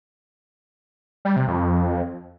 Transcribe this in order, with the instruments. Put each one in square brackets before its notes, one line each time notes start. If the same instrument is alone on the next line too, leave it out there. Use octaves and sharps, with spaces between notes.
[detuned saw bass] G3
C3
F2